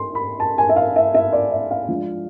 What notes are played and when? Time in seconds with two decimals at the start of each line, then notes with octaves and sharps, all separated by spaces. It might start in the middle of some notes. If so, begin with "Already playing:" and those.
Already playing: C6
0.15 B5
0.40 A5
0.58 G#5
0.69 E5
0.76 F5
0.96 E5
1.14 E5
1.33 D5
1.52 E5
1.71 F5
1.89 F3 G#3 D4